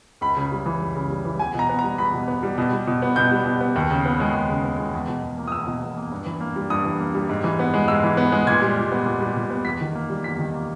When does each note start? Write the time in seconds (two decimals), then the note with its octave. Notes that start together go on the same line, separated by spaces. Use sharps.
0.21 C#2 B5
0.37 C#3
0.52 G3
0.66 E3
0.81 C#2
0.95 C#3
1.10 G3
1.25 E3
1.39 E2 G#5
1.54 B2
1.59 A#5
1.69 B3
1.79 A#5
1.84 G3
1.98 E2 B5
2.13 B2
2.28 B3
2.43 G3
2.58 B2
2.73 G3
2.87 B2
3.02 B3
3.16 B2 G6
3.31 G3
3.46 B2
3.61 B3
3.76 D#2
3.90 C#3
4.05 B3
4.20 G#3
4.34 D#2
4.49 C#3
4.64 B3
4.79 G#3
4.94 E2
5.08 B2
5.23 E2
5.38 A#3
5.48 D#6
5.52 E2 E6
5.67 B2
5.82 E2
5.97 A#3
6.11 G2
6.26 E3
6.40 A#3
6.56 G3
6.70 G2 D#6
6.85 E3
7.00 A#3
7.15 G3
7.29 G#2
7.44 E3
7.59 B3
7.74 G#3
7.88 G#2 E6
8.03 E3
8.17 B3
8.32 G#3
8.47 A#2 G#6
8.62 G3
8.77 A#2
8.92 B3
9.06 A#2
9.20 G3
9.36 A#2
9.50 B3
9.65 E2 B6
9.81 D#3
9.95 A#3
10.10 G3
10.24 E2 B6
10.39 D#3
10.54 A#3